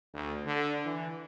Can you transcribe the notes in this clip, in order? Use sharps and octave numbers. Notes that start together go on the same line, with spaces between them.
D2
D3
E3